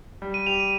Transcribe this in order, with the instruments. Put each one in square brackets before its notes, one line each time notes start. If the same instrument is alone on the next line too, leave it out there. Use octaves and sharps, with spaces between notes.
[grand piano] G3
[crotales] D#7
[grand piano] G4 [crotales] F7
[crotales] D#7